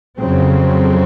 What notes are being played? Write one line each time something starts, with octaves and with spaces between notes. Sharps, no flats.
F2 C#3 F#3 C4